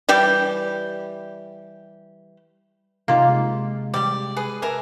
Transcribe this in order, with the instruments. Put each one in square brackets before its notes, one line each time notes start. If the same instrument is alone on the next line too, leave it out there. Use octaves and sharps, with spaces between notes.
[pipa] E3 G3 G4
[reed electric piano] C3 [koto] A#3 G4 [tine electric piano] D#4 F4 F5
[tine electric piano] G#3
[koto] G3 G4 [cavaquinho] D5
[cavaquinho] G#4 B4
[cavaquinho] A#4 E5 G#5 [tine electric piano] B4